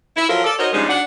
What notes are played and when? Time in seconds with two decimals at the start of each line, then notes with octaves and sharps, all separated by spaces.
0.16 E4
0.29 F3 F#3 F4 A4 A#4
0.44 A4 D5
0.58 D#4 F#4 A#4 C5 C#5 D#5
0.73 C#3 F3 G3 G#3 D4 D#4
0.89 D4 F#5